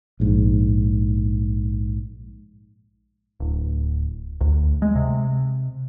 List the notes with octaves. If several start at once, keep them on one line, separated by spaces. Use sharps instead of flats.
A#1 G#2
D1
D2
G#3
C3